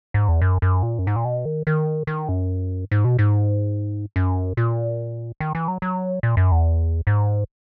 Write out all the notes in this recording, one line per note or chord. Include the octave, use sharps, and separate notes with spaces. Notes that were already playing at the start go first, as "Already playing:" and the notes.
G#2
E2
F#2
F#2
A#2
F#2
G#2
A#2
B2
D#3
D#3
D#3
F#2
G#2
B2
G#2
F#2
A#2
D#3
E3
F#3
F#3
A#2
F#2
E2
G#2